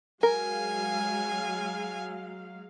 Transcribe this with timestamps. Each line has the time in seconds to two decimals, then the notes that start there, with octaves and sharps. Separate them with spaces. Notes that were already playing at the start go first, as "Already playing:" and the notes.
0.23 F#3 G#3 A#4 F5 G#5